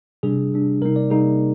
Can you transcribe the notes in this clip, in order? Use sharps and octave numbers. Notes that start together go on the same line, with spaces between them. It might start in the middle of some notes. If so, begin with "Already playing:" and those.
C3 G3 D4 G#4
C3 G3 D4
C3 G3 A#3 D#4 A#4
D5
C3 G3 A#3 D#4 G#4